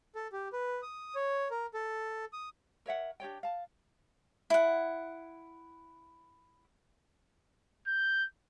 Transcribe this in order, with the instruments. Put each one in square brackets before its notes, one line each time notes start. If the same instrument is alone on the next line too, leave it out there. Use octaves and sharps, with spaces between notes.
[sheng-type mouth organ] A4
G4
B4
D#6
C#5
A#4
A4
D#6
[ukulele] A#4 C#5 E5 F#5
D4 G4 C#5 G5
F5 A5
[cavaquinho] E4 F#5
[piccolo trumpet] G6